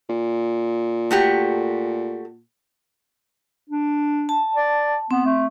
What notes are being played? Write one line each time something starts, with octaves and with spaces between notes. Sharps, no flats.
A#2
A3 F#4 G4
D4
A5
D5
B3 C4
A3